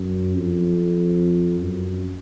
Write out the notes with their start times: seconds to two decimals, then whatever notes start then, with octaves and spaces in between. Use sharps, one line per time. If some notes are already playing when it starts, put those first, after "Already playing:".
Already playing: F#2
0.36 F2
1.61 F#2